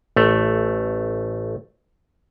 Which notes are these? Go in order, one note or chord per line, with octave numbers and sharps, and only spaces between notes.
A1 A3